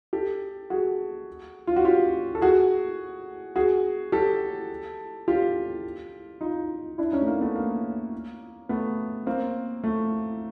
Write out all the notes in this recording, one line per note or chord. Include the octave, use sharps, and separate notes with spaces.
G4 A4
F#4 G#4
F4
F#4
F4 G4
A4
F#4 G#4
F#4 G#4
G4 A4
F4 G4
D#4 F4
D4 E4
C#4 D#4
A3
A#3
A3 B3
A#3
A3 B3
A#3 C4
A3